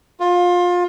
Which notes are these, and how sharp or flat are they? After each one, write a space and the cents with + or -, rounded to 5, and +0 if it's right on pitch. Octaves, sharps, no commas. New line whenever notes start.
F4 +25